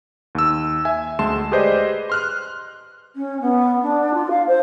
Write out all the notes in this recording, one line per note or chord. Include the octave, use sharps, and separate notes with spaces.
D#2 E6
E5 G#5
D2 G#3 A5 C6 E7
G4 G#4 B4 C5 D5 D#5
C6 F6 F#6
C#4
B3
D4
F4
F5
C5